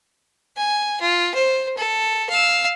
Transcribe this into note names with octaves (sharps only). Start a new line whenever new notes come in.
G#5
F4
C5
A4
F5 E6